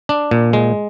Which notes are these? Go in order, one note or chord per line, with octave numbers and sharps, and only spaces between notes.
D4
A#2
G#3